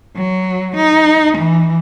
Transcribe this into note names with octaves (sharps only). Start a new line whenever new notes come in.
F#3
D#4
E3